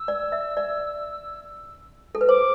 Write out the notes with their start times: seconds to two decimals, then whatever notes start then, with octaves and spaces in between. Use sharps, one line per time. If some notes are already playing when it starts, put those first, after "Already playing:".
Already playing: E6
0.08 D5
0.32 E5
0.57 D5
2.15 A4
2.21 B4
2.29 C5 D6